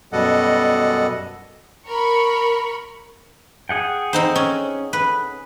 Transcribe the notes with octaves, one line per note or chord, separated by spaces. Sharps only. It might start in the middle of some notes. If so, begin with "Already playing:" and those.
F#2 B2 G3 A4 D#5 F#5
A#4 B5 C#6
G#4 F#5 G5
C4 D#4 C5
C#4
B4